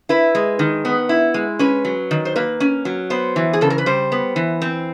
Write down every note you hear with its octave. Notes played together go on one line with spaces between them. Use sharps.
E4 B4
G#3
D#3
B3
E4
G#3
C#4 B4
F#3
D#3
C5
A#3 B4
C#4
F#3
B3 C5
E3
G#4
C#3 A4
A#4
B4
G3 C5
B3
E3
C4